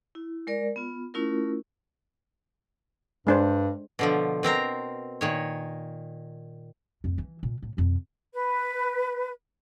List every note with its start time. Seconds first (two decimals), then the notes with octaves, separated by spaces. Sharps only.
0.15 E4
0.47 G#3 A#4 D5
0.76 B3 F4
1.14 A3 C#4 E4 F4 A#4
3.27 G2 G#3 D4 C5
3.99 B2 D3 F3
4.43 B2 C4 A#4 A#5
5.21 A#2 D#3 C#5
7.04 F2 A3
7.18 E3
7.43 A#2
7.62 A2
7.77 F2 B2
8.33 B4